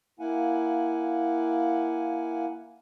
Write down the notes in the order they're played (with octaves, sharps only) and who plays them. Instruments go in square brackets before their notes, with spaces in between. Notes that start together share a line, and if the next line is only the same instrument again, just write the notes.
[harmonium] A#3 E4 F5 F#5 G#5